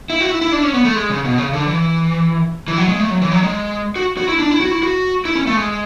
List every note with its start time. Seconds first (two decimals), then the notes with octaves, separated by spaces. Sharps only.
0.10 E4
0.20 F#4
0.31 E4
0.41 E4
0.52 D4
0.63 C#4
0.73 B3
0.85 A3
0.95 G#3
1.10 C#3
1.25 B2
1.38 C#3
1.53 D3
1.67 E3
2.68 E3
2.78 F#3
2.89 G#3
3.00 A3
3.10 F#3
3.22 E3
3.32 F#3
3.43 G#3
3.96 F#4
4.17 F#4
4.28 E4
4.39 D4
4.50 E4
4.61 F#4
4.71 E4
4.83 F#4
5.25 E4
5.36 C#4
5.47 A3
5.57 G#3